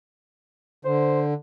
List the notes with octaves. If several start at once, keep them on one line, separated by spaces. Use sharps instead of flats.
D3 C5